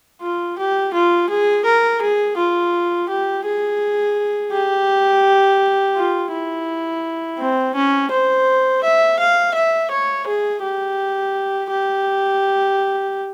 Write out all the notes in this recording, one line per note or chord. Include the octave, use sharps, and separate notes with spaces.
F4
G4
F4
G#4
A#4
G#4
F4
G4
G#4
G4
F4
E4
C4
C#4
C5
E5
F5
E5
C#5
G#4
G4
G4